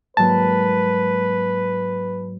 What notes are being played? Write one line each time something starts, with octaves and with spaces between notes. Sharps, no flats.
G#2 F#3 A#3 B4 A5